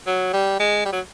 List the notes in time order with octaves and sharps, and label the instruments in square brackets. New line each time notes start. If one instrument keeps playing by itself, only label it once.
[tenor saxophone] F#3
G3
G#3
G3
F#3